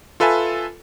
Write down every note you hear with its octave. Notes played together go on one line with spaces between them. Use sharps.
F4 A4 B4 E5 G#5